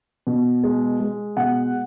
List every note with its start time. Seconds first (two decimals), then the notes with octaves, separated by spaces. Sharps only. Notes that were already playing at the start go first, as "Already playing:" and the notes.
0.27 B2
0.63 G#3
1.00 G#3
1.37 B2 F#5